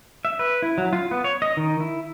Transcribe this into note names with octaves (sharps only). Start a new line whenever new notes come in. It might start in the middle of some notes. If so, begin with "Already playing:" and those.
E5
B4
E4
F#3
F4
B3
C#5
D#5
D#3
E4